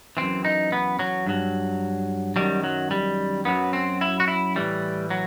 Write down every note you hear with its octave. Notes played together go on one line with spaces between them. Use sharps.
F#2 E3 C4
D#4
B3
F#3
G2 F#3
F#2 D#3 F#3 G3
F#3
G3
F#2 F#3 B3
C4
E4
F#4
E4
A2 E3 G3
F#3